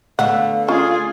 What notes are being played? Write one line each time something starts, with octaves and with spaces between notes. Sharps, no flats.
D3 A3 B3 F5 F#5
C#4 F4 G#4